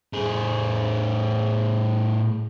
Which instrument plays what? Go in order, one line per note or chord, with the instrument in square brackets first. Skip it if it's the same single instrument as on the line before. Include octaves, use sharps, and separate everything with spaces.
[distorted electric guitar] A2 G#4